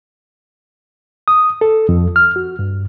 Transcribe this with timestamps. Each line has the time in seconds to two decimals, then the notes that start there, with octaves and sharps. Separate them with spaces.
1.28 D#6
1.61 A4
1.89 F2
2.16 F6
2.36 F#4
2.59 G2